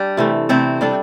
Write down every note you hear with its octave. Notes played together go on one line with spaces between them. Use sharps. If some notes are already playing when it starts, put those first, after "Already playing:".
Already playing: G3 D4
C3 E3 A3
C3 A3 C4 E4 A4
G3 D4 A4